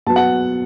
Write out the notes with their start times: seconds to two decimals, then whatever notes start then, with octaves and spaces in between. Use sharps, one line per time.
0.06 B2 F#3 B3 A5
0.16 F#5